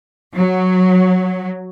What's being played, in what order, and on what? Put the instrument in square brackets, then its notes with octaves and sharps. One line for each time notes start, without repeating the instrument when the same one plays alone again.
[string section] F#3